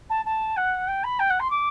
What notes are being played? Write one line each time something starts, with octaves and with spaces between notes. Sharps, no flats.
A5
A5
F#5
G5
B5
G5
F#5
C6
D6